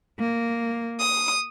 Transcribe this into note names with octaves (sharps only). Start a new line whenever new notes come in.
A#3
D#6